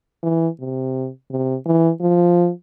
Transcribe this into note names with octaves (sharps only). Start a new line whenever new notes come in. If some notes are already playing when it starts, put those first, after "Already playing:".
E3
C3
C3
E3
F3